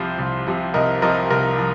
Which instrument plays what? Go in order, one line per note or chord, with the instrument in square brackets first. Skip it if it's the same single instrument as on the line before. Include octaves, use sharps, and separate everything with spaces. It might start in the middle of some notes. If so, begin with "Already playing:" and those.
Already playing: [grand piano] C2 C3 F3 C5
C2
C3 F3
C2 A#4 D#5
C3 F3 A#4 D#5
C2 A#4
F3